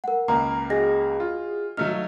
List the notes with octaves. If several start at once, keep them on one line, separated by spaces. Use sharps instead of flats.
A#4 F#5
C#2 A#3 A#5
F#4 G#4 D#5 A#6
F4
F#3 A3 D#4 F5 F6